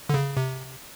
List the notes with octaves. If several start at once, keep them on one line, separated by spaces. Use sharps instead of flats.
D3
C#3
C3